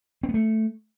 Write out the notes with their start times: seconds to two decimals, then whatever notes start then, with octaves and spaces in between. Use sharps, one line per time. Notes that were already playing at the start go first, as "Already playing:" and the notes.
0.23 C4
0.29 B3
0.34 A3